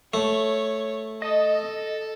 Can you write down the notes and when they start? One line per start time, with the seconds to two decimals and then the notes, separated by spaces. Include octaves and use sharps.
0.14 A3 C#5
1.22 A4 D#5